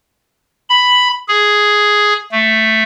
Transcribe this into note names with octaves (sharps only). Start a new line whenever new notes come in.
B5
G#4
A3